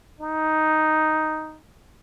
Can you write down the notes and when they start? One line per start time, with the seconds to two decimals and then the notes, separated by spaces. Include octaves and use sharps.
0.21 D#4